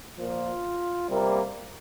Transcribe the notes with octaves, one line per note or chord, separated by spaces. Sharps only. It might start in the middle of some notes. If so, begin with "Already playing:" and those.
A#2 F3 A#3 F4
C3 G3 A#3